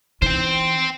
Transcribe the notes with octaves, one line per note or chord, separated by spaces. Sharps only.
E3 D#4 C5 G5